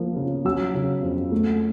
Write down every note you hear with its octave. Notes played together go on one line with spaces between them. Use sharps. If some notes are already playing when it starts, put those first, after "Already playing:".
Already playing: F3 A#3
C#3
F#3 E6
C#3
F2
A3